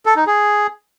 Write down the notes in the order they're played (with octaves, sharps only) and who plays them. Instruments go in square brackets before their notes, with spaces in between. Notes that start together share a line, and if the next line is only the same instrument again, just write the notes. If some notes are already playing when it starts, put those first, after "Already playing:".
[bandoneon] A4
D#4
G#4